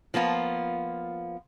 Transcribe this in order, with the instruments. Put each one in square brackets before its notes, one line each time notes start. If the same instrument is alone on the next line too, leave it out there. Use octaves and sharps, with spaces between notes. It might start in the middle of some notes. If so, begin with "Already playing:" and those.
[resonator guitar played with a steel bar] F3 A#3 B3 F4